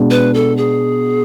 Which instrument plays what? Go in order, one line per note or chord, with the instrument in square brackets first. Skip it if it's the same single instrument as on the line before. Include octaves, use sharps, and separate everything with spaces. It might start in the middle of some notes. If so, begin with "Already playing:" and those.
Already playing: [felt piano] B2 G#3 B3 D4
[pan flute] B4
A4
G#4